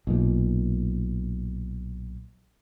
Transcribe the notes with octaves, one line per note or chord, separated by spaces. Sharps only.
B1 A#2